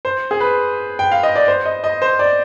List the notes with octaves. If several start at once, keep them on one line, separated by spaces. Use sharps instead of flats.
C5
G#4
B4
G5
F5
D#5
D5
C5
D#5
D#5
C5
D5